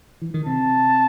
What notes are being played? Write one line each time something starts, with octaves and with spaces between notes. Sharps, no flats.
E3
D#3
C3 A5